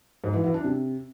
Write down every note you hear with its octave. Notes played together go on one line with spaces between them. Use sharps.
G#2
E3
E3
D4
C3